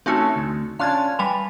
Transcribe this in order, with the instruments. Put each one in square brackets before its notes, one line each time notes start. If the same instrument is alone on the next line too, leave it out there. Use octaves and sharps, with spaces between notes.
[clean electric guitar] A3 C#4 A4 [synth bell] C4 D#4 F#4
[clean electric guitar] D2
[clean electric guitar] C#4 D4 F4 [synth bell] F5 A5 G#6
[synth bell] G3 G#5 F7 [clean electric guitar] B4